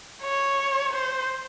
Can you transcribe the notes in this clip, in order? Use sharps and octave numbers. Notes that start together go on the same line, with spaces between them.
C#5
C5